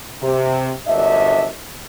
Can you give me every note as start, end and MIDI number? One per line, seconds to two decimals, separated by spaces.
0.22 0.71 48
0.87 1.48 31
0.87 1.48 42
0.87 1.48 62
0.87 1.48 75
0.87 1.48 76